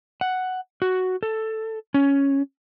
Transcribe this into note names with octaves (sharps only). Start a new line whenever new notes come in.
F#5
F#4
A4
C#4